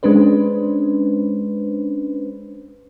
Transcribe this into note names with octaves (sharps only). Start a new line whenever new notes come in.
G#3 C#4 D4 B4 C5